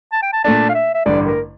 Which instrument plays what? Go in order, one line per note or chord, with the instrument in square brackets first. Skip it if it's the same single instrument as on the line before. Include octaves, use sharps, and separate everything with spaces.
[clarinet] A5
G5
A5
[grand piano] A#2 A3 D4 [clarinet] A5
[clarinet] F5
E5
E5
[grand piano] A1 G2 D3 [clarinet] D5
[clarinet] A#4